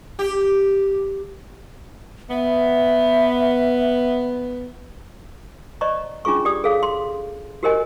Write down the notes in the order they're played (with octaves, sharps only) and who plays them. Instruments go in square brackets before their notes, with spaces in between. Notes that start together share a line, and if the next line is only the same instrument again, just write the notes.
[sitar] G4
[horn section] B3 [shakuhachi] E5
[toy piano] C5 D5 D#5 A#5 C#6
C#4 D4 F4 G#4 C#6
G4 D5 D#6
G#4 A4 C#5 F5
C6
F#4 G4 A#4 C5 D#5 G#5